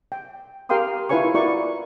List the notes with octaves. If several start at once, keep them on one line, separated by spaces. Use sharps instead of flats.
G5
G4 A#4 F5 G5 C6 D#6
E4 F4 B4 C#5 G#5 C#6
E4 F#4 A#4 B4 D5 C#6